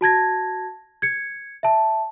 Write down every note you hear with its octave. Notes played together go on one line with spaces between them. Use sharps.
F#4 A5 G#6 A#6
G#6 C#7
E5 A5